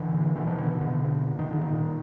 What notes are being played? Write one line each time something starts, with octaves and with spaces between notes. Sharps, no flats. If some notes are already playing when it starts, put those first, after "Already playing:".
Already playing: D3 E3
A#2
B2 D3 E3
D#3 F3
B2 D3 E3
B2 D3
B2
A#2
D#3
A#2 D3
D#3
A#2